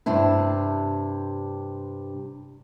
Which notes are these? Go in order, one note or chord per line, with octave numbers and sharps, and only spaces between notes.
G2 C3 D4 E4